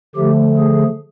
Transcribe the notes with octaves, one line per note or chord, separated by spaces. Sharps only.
D3 F3 A3 G4
G#4